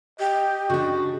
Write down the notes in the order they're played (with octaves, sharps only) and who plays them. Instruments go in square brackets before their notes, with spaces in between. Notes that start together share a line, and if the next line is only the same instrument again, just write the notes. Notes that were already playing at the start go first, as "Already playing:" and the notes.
[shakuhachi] G4 [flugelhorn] D#5
[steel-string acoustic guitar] C#3 D4 [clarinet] F#4